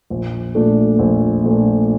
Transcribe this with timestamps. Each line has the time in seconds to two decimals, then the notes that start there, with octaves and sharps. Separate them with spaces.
0.10 A#1
0.55 A#2 A3 D4
0.99 A#1
1.44 A#2 A3 D4